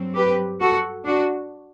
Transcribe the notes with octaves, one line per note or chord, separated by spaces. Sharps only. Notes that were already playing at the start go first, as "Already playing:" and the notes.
Already playing: G2 F#3 C4
G4 B4
F#4 A4
D4 F#4